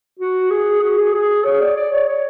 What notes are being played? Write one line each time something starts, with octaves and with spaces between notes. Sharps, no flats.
F#4
G#4
F#4
G#4
G#4
C#5
D5
D5
C#5
C#5